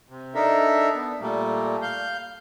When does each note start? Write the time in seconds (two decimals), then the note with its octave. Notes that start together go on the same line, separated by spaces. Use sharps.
0.10 C3
0.35 D4 D#4 A4 A#4 E5
0.95 B3
1.21 A#2 G3 A3 A#3
1.82 F5 G6